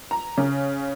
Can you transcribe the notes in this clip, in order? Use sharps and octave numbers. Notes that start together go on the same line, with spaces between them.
A#5
C#3